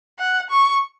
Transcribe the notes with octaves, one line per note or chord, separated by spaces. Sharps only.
F#5
C#6